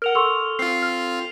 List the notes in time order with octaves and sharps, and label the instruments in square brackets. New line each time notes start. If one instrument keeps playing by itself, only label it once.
[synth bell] A#4 F#5 [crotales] F6 F7
[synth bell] A4 [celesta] C6 C#6 E6 [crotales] F7
[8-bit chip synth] C4 F4 [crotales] C7
[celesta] F6